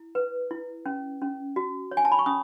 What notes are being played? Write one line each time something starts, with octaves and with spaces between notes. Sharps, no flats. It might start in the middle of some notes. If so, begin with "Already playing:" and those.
Already playing: E4
B4
E4
C#4
C#4
F#4
C#5
G#5
A5
B5
C#6
C#4 D#6